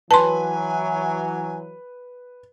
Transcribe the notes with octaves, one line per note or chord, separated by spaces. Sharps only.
E3 F#3 B4 G#5 A5 C6